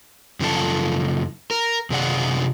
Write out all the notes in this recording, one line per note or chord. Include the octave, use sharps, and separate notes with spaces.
F#2 C#3 F3 G4 A4 A5
A#4
F#2 C3 G#4 D5 F#5